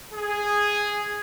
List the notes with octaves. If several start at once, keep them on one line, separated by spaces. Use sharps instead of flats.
G#4